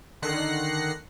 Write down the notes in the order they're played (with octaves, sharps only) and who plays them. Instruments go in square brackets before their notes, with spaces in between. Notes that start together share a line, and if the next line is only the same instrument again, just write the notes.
[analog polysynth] D3 D#3 F#6 A#6 C7 C#7